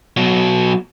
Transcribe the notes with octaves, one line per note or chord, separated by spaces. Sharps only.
B2 F#3